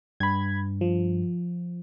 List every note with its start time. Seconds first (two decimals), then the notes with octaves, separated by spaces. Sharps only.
0.20 G2 B5 G#6
0.81 F3